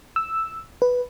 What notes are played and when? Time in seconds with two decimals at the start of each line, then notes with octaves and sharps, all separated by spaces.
0.16 E6
0.82 B4